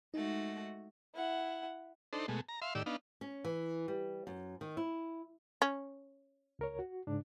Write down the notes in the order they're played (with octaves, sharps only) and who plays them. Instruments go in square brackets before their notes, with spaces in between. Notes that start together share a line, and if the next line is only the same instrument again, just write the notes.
[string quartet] G#3 A3 F#4 [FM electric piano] D#4
[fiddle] E4 F#5
[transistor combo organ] D4 D#4 A4 C5
B2 G#3 A3
A#5
E5 F5 C6
A2 D#3 G4 D5 E6
B3 D4 D#4 F5
[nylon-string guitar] C#4
E3
G3
F#2
D#3
E4
[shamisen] C#4
[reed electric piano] C#2 A#4 C#5
F#4
G#2 C#3 D4